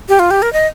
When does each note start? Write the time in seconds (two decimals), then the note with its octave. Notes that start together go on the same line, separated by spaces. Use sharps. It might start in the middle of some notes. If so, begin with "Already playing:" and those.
0.09 G4
0.19 F4
0.31 G4
0.42 A#4
0.53 D#5